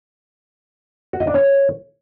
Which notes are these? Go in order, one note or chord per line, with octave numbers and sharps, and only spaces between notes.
F#4
D#5
D4
C#5